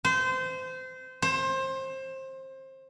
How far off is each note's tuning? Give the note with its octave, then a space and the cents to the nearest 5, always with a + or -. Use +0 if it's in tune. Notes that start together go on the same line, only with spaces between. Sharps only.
C5 -25
C5 +25